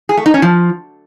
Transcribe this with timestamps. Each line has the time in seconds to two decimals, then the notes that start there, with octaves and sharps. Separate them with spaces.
0.09 G#4
0.17 A3
0.26 D#4
0.34 C#4
0.42 F3